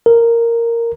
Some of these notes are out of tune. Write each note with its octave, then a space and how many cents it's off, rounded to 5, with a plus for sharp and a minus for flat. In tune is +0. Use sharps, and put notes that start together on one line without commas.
A#4 -5